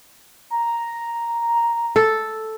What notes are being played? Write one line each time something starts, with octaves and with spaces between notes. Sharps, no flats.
A#5
A4